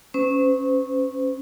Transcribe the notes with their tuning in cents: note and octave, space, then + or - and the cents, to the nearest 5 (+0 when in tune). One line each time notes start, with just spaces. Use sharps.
C#4 -15 C5 -45